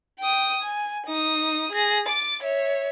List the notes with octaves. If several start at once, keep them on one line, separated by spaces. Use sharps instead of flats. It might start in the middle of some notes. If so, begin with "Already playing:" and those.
G5 D#6
G#5
D#4 D#6
G#4 A#6
D6 A6
C#5 E5